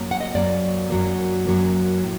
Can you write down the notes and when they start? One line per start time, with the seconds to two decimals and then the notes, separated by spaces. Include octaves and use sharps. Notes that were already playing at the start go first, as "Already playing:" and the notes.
Already playing: F#2 F#3 A#3
0.11 F#5
0.21 D#5
0.35 F#2 F#3 A#3 D5
0.90 F#2 F#3 A#3
1.47 F#2 F#3 A#3
2.03 A2